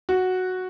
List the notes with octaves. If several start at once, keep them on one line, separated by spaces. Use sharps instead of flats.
F#4